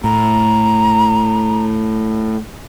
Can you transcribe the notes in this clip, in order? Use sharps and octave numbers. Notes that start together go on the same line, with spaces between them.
A2 A#5